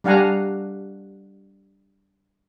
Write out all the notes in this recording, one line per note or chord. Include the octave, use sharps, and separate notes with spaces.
G3 D4 F5 F#5 G#5 A#5